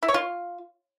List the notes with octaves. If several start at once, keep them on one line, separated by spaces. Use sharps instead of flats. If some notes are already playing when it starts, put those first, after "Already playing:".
E4
C#5
F4